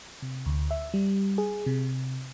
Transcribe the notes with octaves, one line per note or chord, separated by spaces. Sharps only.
C3
D2
E5
G3
G#4
C3